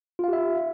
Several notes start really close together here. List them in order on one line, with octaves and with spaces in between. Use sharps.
F4 F5 G4 E5